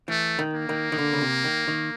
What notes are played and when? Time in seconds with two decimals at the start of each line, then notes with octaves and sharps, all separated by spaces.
0.08 E3 A3
0.39 D#3
0.54 A#3
0.69 D#3
0.92 D#3
0.99 D3
1.13 C#3
1.21 C3
1.44 D#3
1.68 D#3